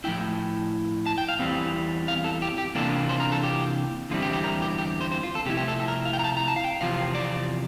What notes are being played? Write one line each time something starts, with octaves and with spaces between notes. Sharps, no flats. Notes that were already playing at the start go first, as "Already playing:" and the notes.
A2 F3 A3 E4 G5
A5
G5
F5
E2 E3 G3 C4
F5
A4
G4
G4
C3 E3 A#3 D4 F4 A4
C5
A#4
A4
G4
E2 D3 G3 C4 E4 F4
G4
G4
A#4
G4
G4
C5
C5
F4
A4
C3 F3 A3 E4 G4
G4
A4
A4
A#4
F5
G5
A#5
A5
A#5
A5
F5
G5
E2 C3 F3 C4 F4 F5
D5